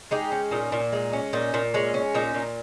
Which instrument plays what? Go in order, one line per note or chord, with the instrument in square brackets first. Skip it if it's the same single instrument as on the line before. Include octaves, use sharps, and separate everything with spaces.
[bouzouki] G#3 D#4 G4
C#4
A#2 D#4
A#2
G#3 D#4
C#4
A#2 D#4
A#2
G#3 C#4
C#4
A#2 D#4
A#2